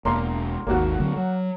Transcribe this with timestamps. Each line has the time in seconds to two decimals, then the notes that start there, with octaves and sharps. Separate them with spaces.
0.05 E1 A#3 A#5 C6
0.67 G#1 D#2 A#3 F#4
1.00 D3 F#3 C4
1.16 F#3